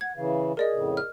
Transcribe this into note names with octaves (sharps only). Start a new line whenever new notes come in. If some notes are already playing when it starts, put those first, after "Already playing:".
F#5 G#6
C#3 E3 F5
G#4 A#4 D5 D#5
F2 A2 C#3
F6